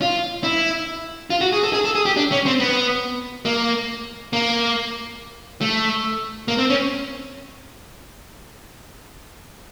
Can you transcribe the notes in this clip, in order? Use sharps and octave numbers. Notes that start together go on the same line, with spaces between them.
F4
E4
F4
F#4
G#4
A4
G#4
A4
G#4
G4
D4
C#4
C4
B3
A#3
A#3
A3
A#3
C4
C#4